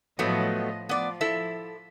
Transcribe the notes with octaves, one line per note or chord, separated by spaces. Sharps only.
A2 F3 F#3 A3 B3 D#5
F3 B3 D5
E4 A4 E5